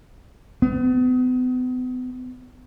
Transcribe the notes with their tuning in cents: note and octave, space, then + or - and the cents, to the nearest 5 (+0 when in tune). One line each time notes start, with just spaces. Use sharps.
B3 +40